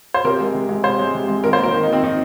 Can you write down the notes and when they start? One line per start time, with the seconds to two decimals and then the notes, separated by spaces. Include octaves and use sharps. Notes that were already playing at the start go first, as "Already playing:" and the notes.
0.14 C5
0.24 C3 A#4
0.40 G#3
0.54 C3
0.69 G#3
0.84 C3 C5
0.99 G#3
1.14 C3
1.28 G#3
1.44 D#3 A#4
1.53 C5
1.58 A#3
1.64 A#4
1.74 D#3
1.83 A#3 D#4
1.93 C4
2.03 D#3 D#4